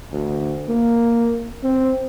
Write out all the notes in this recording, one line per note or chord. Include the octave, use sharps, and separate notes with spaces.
D2
A#3
C4